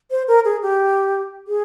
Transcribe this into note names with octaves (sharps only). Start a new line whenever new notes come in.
C5
A#4
G#4
G4
G#4